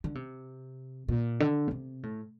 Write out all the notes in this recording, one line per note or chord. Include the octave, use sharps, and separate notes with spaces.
D3
C3
A#2
D3
A#2
C3
A2